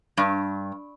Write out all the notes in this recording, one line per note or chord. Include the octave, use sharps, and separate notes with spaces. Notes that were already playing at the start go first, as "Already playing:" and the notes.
G2